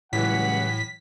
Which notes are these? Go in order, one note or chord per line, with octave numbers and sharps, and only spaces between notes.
C#2 A2 E3 F#3 G3 F#5 B6